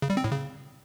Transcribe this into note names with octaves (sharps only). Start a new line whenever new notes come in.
C#3
G3
C4
A2
C#3